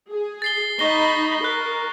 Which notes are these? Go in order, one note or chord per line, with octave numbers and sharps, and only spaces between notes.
G#4
A6 C7 G7
D#4 B5 C#6 A#6 G7
A#4 F#6